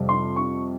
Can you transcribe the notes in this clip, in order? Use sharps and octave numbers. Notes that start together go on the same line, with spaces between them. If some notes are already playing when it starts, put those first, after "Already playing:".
Already playing: F2 C3 G3
C6
C#6